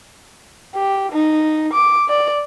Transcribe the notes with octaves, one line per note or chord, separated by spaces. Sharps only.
G4
D#4
D6
D5